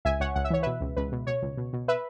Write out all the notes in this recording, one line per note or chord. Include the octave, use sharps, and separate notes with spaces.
C#2 E5 G#5
C#2 C#5 F#5
C#2 F#5
E5
E3 C#5
B2 B4 E5
C#2
C#2 B4
B2
B2 C#5
C#2
B2
B2
B4 E5